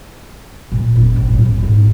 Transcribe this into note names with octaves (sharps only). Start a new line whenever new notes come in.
A#2 A3
F#1 E2
A#1
F#2 A2
E2
G#2 B3